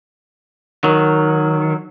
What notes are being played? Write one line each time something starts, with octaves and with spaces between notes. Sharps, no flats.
D#3 F#3